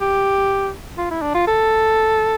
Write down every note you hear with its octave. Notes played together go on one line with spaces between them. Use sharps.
G4
F4
E4
D4
F4
A4